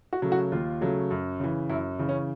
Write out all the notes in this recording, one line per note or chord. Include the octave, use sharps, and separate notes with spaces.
F#4
C#3 F#3 A3
F#4
D#2 F4
C#3 F#3 A3
F#2
C#3 E3
F#2 E4
C#3 E3
C#4